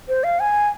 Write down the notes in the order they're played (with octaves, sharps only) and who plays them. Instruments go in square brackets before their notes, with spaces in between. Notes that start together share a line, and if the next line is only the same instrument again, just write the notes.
[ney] C5
F5
G#5